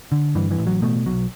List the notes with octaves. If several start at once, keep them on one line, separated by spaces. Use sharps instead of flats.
D3
G2 E3
E3
A1
F#3
B2 A3
B1 F#3